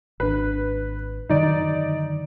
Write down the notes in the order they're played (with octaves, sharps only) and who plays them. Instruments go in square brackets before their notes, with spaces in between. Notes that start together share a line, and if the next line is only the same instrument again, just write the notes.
[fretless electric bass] G#1 D4 [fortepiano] B4
[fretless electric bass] F#2 D3 D#3 [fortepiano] D#4 D5